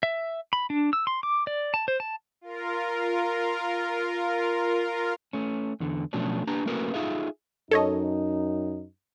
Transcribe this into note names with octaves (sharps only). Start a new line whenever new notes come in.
E5
B5
D4
E6
C6
D6
D5
A5
C5
A5
F4 A#4
A3 C#4
E2 D3
B2 F3 F#3 A3 C#4 D4
A#3 D4 G4 B4 A#5
A3 A#3 C#4 F#4 A#4 B4
D#4 F4 G#4 A4 E5 F5
F#2 D#4 A4 C#5 D#5